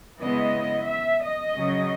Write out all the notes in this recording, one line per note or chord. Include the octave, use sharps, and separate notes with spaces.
C#3 G#3 B3 E4 D#5
E5
D#5
C#3 F#3 C#4